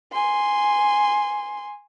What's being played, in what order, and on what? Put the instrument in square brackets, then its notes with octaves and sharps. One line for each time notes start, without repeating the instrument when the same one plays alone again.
[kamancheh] G#5 C6